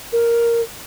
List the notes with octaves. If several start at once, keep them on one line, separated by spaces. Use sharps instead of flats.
A#4